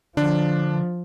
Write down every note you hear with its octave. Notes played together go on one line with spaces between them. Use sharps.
D3 F3 D4